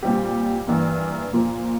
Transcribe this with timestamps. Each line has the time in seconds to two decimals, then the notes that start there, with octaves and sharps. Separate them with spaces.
0.03 A#2 G3 C4 G4
0.67 G2 E3 A#3
1.33 A#2 F3 A#3